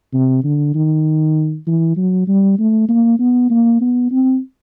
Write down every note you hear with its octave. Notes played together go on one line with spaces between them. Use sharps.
C3
D3
D#3
E3
F#3
G3
A3
A#3
B3
A#3
B3
C4